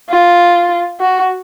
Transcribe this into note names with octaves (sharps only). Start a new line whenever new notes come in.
F4
F#4